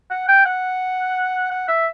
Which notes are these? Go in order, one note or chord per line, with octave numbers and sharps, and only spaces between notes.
F#5
G5
F#5
F#5
E5